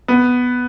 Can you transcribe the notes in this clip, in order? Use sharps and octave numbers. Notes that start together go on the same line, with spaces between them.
B3